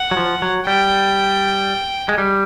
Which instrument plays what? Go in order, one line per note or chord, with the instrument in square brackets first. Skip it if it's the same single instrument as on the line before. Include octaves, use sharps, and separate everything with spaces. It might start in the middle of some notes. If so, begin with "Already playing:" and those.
Already playing: [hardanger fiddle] F#5
[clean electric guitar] F#3
F3
F#3
[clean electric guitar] G3 [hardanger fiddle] G5
[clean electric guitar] G#3
G3